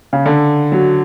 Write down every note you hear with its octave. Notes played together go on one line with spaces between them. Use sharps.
C#3
D3
F#3